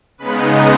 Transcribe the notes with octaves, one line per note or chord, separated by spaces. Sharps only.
C#3 G#3 B3 D#4 B4 B5